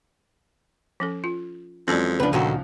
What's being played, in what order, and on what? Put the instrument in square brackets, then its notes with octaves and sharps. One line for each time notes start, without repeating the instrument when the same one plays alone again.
[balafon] F3 C#4 A4
F4
[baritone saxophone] F2 [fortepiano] E3 F#3 G#3 [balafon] C#4 G#4 D5
[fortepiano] C#2 F3 [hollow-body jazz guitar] D4 B4
[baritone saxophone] D2 [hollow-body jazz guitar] A#2 D#3 F#4 [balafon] G5